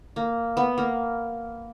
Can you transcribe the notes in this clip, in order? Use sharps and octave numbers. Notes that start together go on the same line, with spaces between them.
A#3
B3
A#3